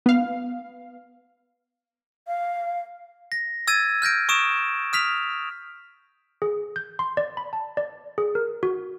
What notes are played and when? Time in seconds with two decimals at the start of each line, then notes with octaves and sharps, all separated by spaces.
0.06 B3 F5
2.27 F5
3.32 A#6
3.68 E6 G#6 A6 D#7
4.02 F6 G6 A#6 D7
4.29 C#6 D#6 D7 E7
4.93 D#6 F6 B6 F7
6.42 G#4
6.76 G6
6.99 C6
7.17 D5
7.37 B5
7.53 A5
7.77 D5
8.18 G#4
8.35 A#4
8.63 F#4